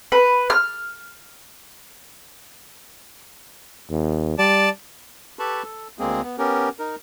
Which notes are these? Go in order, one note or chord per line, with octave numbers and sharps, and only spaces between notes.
B4
F6
D#2
G3 D5 A5
G4 A4 B4 A5 B5 C#6
A4
D2 G#3 A#3 C4 G#4
B3
B3 C#4 G4 A#4
D#4 A#4